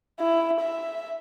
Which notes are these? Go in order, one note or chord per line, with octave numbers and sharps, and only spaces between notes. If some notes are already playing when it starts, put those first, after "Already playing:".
E4
E5